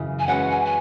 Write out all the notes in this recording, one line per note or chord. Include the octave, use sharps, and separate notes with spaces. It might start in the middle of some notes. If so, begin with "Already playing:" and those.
Already playing: F#2 C#3 E3
G#5
G#3 C#4 F#4 B4 F#5
G#5
G#5